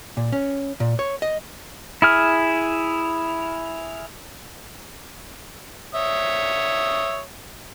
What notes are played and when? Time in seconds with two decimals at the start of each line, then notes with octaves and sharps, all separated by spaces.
0.17 A#2
0.32 C#4
0.80 A#2
0.99 C#5
1.22 D#5
2.02 E4 G#4 F6
5.95 C#5 E5 D#6